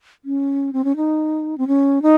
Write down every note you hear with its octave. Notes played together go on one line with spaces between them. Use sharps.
C#4
C4
C#4
D#4
C4
C#4
D#4